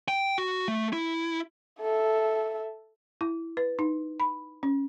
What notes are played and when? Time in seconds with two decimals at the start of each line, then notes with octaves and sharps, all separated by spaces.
0.08 G5
0.38 F#4
0.68 A3
0.93 E4
1.81 A4 E5
3.21 E4
3.57 B4
3.79 D#4
4.20 B5
4.63 C#4